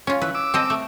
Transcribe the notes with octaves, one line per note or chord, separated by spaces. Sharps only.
C#4 F4
E3 B4
D6 E6
C4 A4 D#5
A3